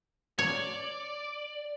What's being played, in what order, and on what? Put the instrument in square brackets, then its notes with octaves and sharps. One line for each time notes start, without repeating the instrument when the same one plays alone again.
[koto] C#5 [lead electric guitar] D5